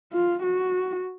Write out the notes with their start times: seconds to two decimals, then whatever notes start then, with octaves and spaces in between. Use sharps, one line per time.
0.13 F4
0.43 F#4